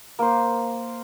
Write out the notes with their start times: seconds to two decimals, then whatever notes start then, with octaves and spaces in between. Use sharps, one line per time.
0.19 A#3 C5